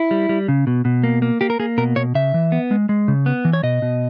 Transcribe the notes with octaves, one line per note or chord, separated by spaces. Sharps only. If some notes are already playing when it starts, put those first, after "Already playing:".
Already playing: E4
G3
G3
C#3
B2
B2
A#3
A#3
A#3 G4
A#4
A#3 G#4
B2 A#4
B2 C#5
C#3 E5
E3
B3
G#3
G#3
C#3
B3
E3
C#5
B2 D#5
B2